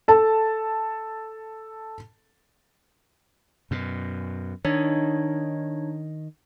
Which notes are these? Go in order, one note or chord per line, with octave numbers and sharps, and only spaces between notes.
A4 A5
F#2 B2
D#3 D4 D#4 C#5